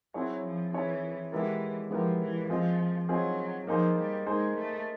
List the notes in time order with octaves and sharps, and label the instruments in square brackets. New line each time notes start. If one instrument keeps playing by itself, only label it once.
[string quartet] F#3 [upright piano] C4 E4 G#4 C#5
[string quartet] F3
[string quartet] E3 [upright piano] C4 E4 G#4 C#5
[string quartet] E3 [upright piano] G#3 B3 E4 G4 A#4
[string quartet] F3 [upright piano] G#3 B3 E4 G4 A#4
[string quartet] E3
[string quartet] F3 [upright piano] C4 F4 G#4 C5 D#5
[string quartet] F#3 [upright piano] C4 F4 G#4 C5 D#5
[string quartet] F3 [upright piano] A#3 D#4 G#4 C5
[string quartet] G3
[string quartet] G#3 [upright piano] A#3 D#4 G#4 C5
[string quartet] A3